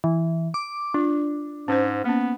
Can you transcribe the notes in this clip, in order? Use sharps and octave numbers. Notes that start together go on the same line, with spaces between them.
E3
D6
D4 F4
G#2 C#4 C5
A#3 B3 C#4